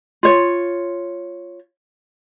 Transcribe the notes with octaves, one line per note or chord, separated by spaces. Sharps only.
F4 C#5